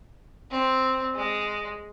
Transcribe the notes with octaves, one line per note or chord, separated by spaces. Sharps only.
C4
G#3